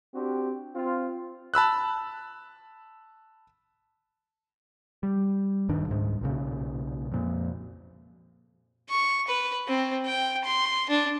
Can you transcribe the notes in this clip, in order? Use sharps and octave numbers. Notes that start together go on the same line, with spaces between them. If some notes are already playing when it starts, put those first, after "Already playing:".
C4 D4 F#4 G4
C4 F4
A5 B5 E6 F#6
G3
D#1 G2 D#3 D4
C#2 G#2
B1 A#2 C#3
F2 A#2
C#6
B4
C4
G5
C6
D4